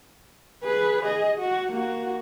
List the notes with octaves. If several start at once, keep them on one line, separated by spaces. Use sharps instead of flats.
G#4 B4
G#4 D#5
F#4
A#3 F#4